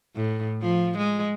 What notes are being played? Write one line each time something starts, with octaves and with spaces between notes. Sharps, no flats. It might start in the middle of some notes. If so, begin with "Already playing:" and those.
A2
F3
G#3